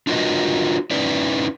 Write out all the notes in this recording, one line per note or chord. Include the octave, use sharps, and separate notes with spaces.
D4 F4 F#4 A#4 B4 D#5
C#4 D#4 E4 B4 D5